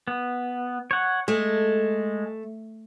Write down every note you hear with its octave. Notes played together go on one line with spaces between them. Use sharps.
B3
C#5 F#5
G#3 A3